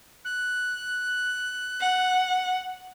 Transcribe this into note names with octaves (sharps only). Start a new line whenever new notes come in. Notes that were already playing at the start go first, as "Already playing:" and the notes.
F#6
F#5